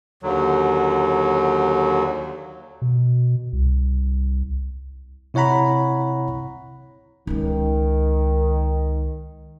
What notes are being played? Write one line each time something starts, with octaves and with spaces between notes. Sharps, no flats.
D#2 D3 F#3
B2
C2
C3 E4 C#5 F#5 A#5 B5
C#2 D#3 G#3